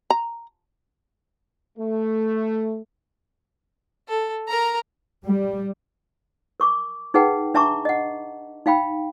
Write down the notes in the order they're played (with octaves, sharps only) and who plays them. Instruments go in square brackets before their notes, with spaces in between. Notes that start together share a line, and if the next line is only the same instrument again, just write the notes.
[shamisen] A#5
[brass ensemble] A3
[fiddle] A4
A#4 A#5
[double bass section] G3
[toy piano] A#4 C#6 D6
D#4 G#4 B4 F#5 G5 A5
D4 E5 A5 A#5 C#6 D6
D#5 F#5
D#4 F5 G5 B5